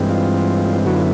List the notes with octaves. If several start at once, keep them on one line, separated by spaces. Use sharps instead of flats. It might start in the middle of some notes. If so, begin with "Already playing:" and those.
Already playing: G2 E3 G#3 C4
F4
F#2 D3 F#3 B3 E4 F#4
F4